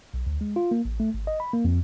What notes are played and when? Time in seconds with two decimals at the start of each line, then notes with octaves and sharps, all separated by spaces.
0.14 B1
0.27 D2
0.41 G#3
0.56 F4
0.71 A#3
0.85 A1
1.00 A3
1.14 G#1
1.27 D#5
1.40 B5
1.53 A#3
1.65 F2